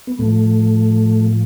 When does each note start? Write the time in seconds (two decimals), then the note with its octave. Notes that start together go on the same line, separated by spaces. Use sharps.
0.07 B3
0.19 A2 F3 A3